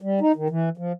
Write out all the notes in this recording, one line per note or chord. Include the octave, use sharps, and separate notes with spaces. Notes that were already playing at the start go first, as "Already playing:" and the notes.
G3
D#4
D#3
E3
F3